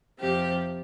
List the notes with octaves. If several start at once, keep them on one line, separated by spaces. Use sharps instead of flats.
F2 C3 F3 G4